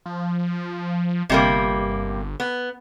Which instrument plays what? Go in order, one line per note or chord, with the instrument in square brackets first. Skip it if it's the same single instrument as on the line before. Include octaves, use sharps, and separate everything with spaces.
[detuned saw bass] F3
[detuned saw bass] G1 [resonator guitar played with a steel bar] C3 G3 A#3
[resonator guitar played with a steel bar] B3